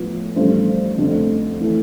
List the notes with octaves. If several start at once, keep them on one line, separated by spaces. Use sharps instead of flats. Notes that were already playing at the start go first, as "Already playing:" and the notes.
Already playing: A2 F3 B3 F4
A1 G2 F3 A3 C5
F1 F2 D3 A3 D4
E3 A3